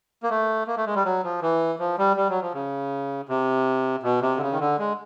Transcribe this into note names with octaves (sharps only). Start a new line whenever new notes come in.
A#3
A3
A#3
A3
G#3
G3
F#3
F3
E3
F3
G3
G3
F#3
F3
C#3
C3
B2
C3
D3
C#3
D#3
D3
G#3